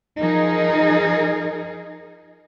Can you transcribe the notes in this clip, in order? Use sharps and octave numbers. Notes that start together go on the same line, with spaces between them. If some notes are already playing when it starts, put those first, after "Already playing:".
F3 D#4 G#4 A#4